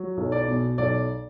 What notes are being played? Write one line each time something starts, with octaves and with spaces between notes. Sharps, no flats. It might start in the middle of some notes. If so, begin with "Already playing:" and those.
Already playing: F#3
B1
D5
B2
B1 D5